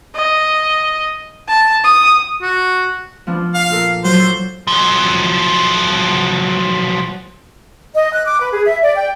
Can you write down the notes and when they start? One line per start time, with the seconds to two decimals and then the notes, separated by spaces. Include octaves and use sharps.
0.15 D#5
1.49 A5
1.85 D#6
2.42 F#4
3.27 F3 B3 D4
3.55 F5
3.70 A#2 A4 A#4
4.04 F#3 C5
4.17 D4 A4
4.67 F3 F#3
7.95 D#5
8.13 F#6
8.27 D6
8.41 B4
8.53 G#4
8.65 E5
8.83 D5
8.96 G5